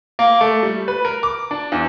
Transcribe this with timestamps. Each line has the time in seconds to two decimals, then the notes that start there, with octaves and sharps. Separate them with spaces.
0.19 A#3
0.41 A3
0.63 G3
0.88 B4
1.05 A#4
1.23 D6
1.51 D4
1.72 E2